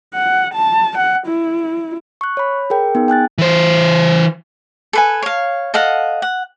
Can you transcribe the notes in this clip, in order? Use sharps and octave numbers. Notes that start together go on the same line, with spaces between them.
F#5
A5
F#5
E4
C#6 F#6
C#5 B5
G#4 A#4 G5
B3 D#4 G#4
G5 G#5 F#6 A6
E3 C5
A4 B4 G#5
C#5 F5
A4 D#5 F5 F#5
F#5